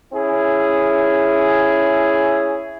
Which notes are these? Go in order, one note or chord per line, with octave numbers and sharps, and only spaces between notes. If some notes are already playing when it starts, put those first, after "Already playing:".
C#4 E4 G#4